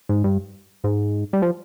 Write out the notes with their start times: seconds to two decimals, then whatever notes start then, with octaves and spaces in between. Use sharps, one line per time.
0.09 G#2
0.24 G2
0.84 G#2
1.33 G3
1.42 F3